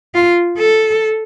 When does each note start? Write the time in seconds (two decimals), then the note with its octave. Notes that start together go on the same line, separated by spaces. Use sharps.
0.14 F4
0.58 A4